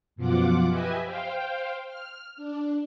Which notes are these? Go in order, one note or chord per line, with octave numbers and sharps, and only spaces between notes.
F#2 B2 F3 F4 F#5 D6
G4 B4 D#5 E5 G#5
C5 F5 G5
F6
D4